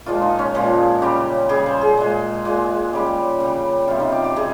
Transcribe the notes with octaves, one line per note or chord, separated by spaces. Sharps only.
A#2 F3 G#3 F4
D#4
C#4
A#2 F3 G#3
C#3 G3 G4
C#3 G3 G#4
C5
G#4
A#2 G#3
A#2 G#3
C#3 G3 G4
C#3 G3
C3 G3 F4
D#4
G4
G4
C3 G3 G#4